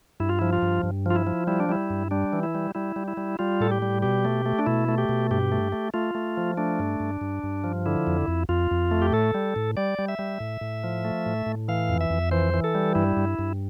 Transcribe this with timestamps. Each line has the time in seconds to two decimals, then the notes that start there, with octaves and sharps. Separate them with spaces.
0.20 G2 E4
0.29 F4
0.39 F3 E4
0.53 F4
0.62 G2
0.83 G2
1.06 F3 F4
1.15 E4
1.27 F3
1.47 G3 E4
1.60 D4
1.69 G3 E4
1.90 G2
2.11 G3 D4
2.33 E3
2.43 E4
2.55 G3
2.75 G3 E4
2.96 G3
3.08 E4
3.17 G3
3.39 G3 F4
3.60 A2 A4
3.72 G4
3.82 G3
4.02 B2 G4
4.25 A3
4.46 A3
4.59 D4
4.66 B2 E4
4.89 A3
4.98 G4
5.09 B2
5.31 G2 G4
5.52 A3
5.72 A3
5.94 A3 F4
6.15 A3
6.37 F3
6.57 A3 D4
6.79 G2
7.00 G2
7.21 G2
7.43 G2
7.64 F3
7.86 D3 E4
8.07 F2
8.28 F2
8.49 F2 F4
8.71 F2
8.91 A3
9.02 G4
9.12 A2 A4
9.34 G3
9.56 A2
9.77 G3 D5
9.99 G3
10.08 E5
10.19 G3
10.40 A2
10.61 A2
10.84 F3
11.05 A3
11.26 A2
11.46 A2
11.68 E3 F5
11.89 F2
12.01 E5
12.10 F2
12.31 E3 C5
12.54 E3
12.64 A4
12.75 G3
12.95 G2 E4
13.17 G2
13.39 G2